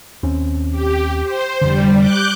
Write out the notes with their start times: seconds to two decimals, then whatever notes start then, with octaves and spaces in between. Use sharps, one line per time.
0.23 D#2 C4 C#4
0.71 G4
1.23 C5
1.61 F1 D3 G3
1.98 D6 F#6 G6